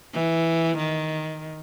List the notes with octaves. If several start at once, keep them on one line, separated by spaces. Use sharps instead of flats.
E3
D#3